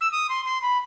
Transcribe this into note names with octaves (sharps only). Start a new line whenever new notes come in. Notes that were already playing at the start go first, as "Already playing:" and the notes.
E6
D#6
C6
C6
B5